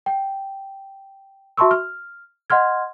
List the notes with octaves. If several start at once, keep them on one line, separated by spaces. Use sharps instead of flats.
G5
F#4 E5 A5 C6 C#6 E6
F6
D#5 F#5 C6 F6 G#6